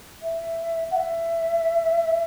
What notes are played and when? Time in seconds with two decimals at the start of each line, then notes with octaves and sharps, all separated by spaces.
0.23 E5
0.91 F#5
0.96 E5